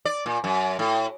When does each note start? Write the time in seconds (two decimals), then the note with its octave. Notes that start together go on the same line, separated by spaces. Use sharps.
0.05 D5
0.26 A#2
0.44 F#2
0.79 A2